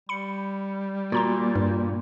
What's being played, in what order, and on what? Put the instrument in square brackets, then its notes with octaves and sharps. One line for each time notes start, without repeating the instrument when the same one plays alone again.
[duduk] G3 [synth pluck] B5 C#7
[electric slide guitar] A#2 [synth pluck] F#4 A#5 C6
[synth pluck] G2